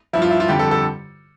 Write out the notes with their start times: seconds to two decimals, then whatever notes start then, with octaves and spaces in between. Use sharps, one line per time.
0.13 G2 F3 E4
0.22 F4
0.31 E4
0.40 F4
0.48 F2 D3 G3 G4
0.59 A4
0.71 A4